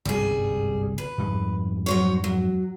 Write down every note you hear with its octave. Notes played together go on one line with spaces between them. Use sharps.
G1 C2 G#2 G3 G#4
B4
F2 G#2 G3
F#3 C5 C#5
F#3